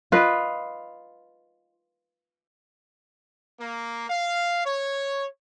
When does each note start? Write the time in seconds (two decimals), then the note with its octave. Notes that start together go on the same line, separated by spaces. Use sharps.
0.12 F4 B4 D#5
3.60 A#3
4.10 F5
4.65 C#5